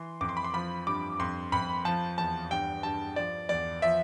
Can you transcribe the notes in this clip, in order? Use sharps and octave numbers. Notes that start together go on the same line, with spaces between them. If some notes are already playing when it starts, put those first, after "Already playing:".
Already playing: E3 C6
F2 D6
C6
B5
C6
F3 B5
G2 D6
F2 C6
F2 B5
F3 A5
E2 A5
G2 G5
G2 A5
F3 D5
E2 D5
F3 E5